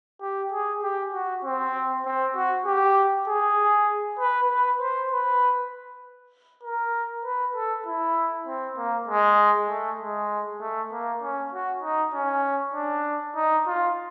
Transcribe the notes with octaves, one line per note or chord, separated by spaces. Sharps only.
G4
G#4
G4
F#4
C4
C4
F#4
G4
G#4
B4
B4
C5
B4
A#4
B4
A4
E4
C4
A#3
G#3
A3
G#3
A3
A#3
C#4
F#4
D#4
C#4
D4
D#4
F4